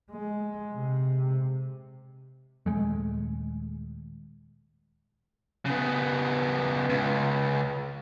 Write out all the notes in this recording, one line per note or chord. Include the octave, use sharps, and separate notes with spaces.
G#3
C3
D#1 G#1 G#3 A3
C#3 B3
C#2